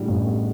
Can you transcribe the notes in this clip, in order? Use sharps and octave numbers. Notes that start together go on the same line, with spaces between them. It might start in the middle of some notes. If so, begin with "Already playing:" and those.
Already playing: A2 D3 G3
A1
B3